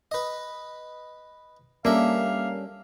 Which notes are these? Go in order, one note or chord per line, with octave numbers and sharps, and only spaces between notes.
B4 D#5
G3 A#3 C#4 D4 A4 E5 F5